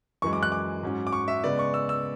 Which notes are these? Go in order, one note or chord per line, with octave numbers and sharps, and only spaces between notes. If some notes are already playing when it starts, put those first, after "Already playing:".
F#2 E3 G#3 C#6
D6
F#6
D6
G#2 F#3 C#4
D6
C#6
E5
C#3 G#3 B3 D5
C#6
E6
E6